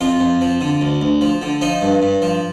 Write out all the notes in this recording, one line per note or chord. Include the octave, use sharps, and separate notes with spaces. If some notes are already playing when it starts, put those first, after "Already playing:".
F2 F4
F2
F3
D3
D2
D2
F3
D3
F3 D#4
G2
G2
F3